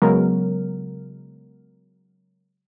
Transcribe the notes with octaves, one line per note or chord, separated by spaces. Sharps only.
C#3 F#3 G#3 B3 A#4